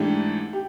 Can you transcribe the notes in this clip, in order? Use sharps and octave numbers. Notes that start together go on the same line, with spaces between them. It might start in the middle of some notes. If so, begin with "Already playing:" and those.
Already playing: G#2 E3 A3 D4 G4
G4